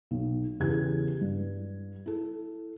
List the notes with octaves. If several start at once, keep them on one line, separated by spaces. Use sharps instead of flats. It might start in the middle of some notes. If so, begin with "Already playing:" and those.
B1
E2 C#3 E3 G4 G#6
G2
E4 A4